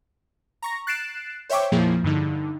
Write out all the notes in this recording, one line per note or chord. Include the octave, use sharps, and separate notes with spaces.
A#5 C#6 A#6
F#6 A6 C7 D7 E7
C5 C#5 E5 G5 C#6 D6
F2 A#2 F3 A#3 E4 G#4
G2 D3 D#4